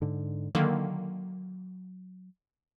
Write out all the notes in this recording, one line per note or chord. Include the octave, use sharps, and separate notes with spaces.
G#2 D3
D3 D#3 F#3 A#3